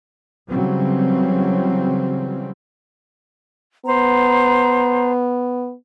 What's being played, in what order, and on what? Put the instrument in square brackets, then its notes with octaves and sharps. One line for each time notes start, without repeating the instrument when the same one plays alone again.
[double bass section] C#3 E3 F#3 G3 C4
[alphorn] B3 [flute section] C5 A#5